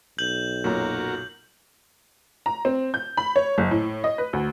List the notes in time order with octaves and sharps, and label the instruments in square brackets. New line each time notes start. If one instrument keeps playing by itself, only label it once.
[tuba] B1 [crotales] G6 F#7
[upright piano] F#2 A#2 A#5 [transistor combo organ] F#4 A#4
[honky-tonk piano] A#5
C4
G6
B5
C#5
F#1
A2
D#5
B4
D2